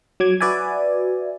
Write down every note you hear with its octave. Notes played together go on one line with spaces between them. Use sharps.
F#3 D6 G#6
F#4 B4 D5 E5 G#5